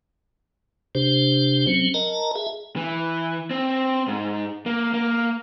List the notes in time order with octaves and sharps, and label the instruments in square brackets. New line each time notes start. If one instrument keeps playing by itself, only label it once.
[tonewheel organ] C3 D4 G4 C5
F#3 C4 C#4
A#4 D#5 A5 A#5
G#4 E5
[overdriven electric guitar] E3
C4
G#2
A#3
A#3